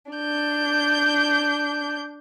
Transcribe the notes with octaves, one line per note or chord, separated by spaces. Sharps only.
D4 G6